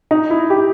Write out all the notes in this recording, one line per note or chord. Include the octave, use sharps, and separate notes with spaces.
D#4
E4
G4